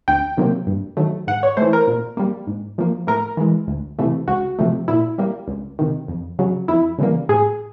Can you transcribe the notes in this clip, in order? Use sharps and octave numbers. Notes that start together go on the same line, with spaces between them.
D2 G5
C3 D#3 F#3 A#3
G2
D#3 F#3 A3
G#2 F#5
C#5
E3 A3 C5
A#4
A#2
G3 A#3
G#2
F3 A#3
A2 A#4
E3 G#3
D2
C3 E3 A3
C#2 F#4
C3 F3 A3
A#2 E4
G3 A#3
C#2
C3 D#3
F2
C#3 F#3
F2 E4
C#3 E3 G3 A#3
A2 G#4